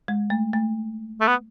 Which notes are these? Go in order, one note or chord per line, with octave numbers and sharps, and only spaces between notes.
G#3
A3
A3
A3
B3